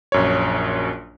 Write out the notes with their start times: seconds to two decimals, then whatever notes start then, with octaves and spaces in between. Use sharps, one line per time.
0.12 A#1 F#2 C#5